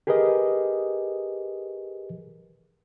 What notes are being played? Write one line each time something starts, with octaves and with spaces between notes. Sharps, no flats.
G4 G#4 A#4 B4 D#5